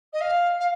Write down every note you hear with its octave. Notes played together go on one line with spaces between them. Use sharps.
D#5
F5
F5